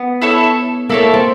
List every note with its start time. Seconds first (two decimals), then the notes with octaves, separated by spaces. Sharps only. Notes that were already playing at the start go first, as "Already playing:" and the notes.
Already playing: B3
0.22 E4 A4 C#5
0.89 A#3 E4 A4 C#5
1.14 C4